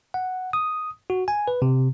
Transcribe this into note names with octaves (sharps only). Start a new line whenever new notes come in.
F#5
D#6
F#4
G#5
B4
C3